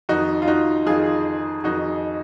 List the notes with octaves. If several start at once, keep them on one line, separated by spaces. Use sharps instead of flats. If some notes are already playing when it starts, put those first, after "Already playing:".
F2 D#3 D#4 F#4
F4
D#4 F#4
F2 D#3 F4 G#4
F2 D#3 D#4 F#4